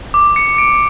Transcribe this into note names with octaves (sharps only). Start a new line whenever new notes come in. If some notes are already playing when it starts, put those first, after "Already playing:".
D6
C#7
D7